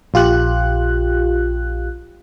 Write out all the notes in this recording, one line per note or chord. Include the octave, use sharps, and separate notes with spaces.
A#1 F4 G4 F#6